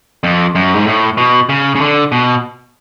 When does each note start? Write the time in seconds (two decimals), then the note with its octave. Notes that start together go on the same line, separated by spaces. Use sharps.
0.24 F2
0.55 F#2
0.75 G#2
0.86 A2
1.17 B2
1.49 C#3
1.76 C#3
1.81 D3
2.12 B2